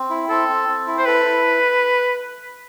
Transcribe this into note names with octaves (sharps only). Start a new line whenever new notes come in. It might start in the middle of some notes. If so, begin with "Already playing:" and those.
Already playing: C4
E4
C4 A4
C4
C4
E4
C5
A4 B4
E4